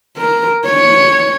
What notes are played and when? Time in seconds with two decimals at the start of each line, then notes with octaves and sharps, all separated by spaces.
0.17 A#4
0.66 C#5